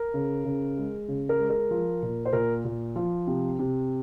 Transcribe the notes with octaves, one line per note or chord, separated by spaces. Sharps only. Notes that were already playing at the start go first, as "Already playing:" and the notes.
Already playing: A#4
C#3
C#3
G#3
C#3
A#4
G#3
A#4
F3
A#2
C5
A#2 A#4
A#2
F3
C3
C3